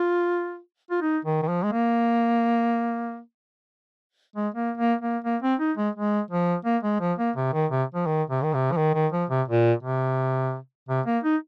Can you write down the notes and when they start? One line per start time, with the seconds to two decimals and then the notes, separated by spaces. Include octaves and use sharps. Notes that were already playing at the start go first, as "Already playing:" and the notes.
Already playing: F4
0.91 F4
1.02 D#4
1.25 D#3
1.43 D#3
1.48 F3
1.63 G#3
1.72 A#3
4.36 G#3
4.54 A#3
4.77 A#3
5.01 A#3
5.24 A#3
5.42 C4
5.60 D#4
5.77 G#3
5.96 G#3
6.30 F3
6.65 A#3
6.83 G#3
7.01 F3
7.19 A#3
7.36 C3
7.54 D#3
7.71 C3
7.94 F3
8.06 D#3
8.30 C3
8.43 D#3
8.54 C3
8.72 F3
8.77 D#3
8.95 D#3
9.12 F3
9.30 C3
9.48 A#2
9.83 C3
10.89 C3
11.06 A#3
11.24 D#4